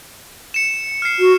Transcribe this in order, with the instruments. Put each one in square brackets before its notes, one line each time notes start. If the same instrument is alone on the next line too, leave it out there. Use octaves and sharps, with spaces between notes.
[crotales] C#7 E7
F6 C7
[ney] F#4